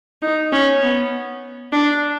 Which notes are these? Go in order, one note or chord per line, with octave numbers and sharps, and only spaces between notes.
D#4
C#4
B3
D4